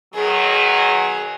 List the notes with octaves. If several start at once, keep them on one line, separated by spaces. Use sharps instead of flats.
B2 D#3 F#3 G#4